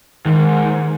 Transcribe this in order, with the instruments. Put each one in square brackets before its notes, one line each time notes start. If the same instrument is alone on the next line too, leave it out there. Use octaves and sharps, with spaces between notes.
[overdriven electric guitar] G#2 [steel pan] D#3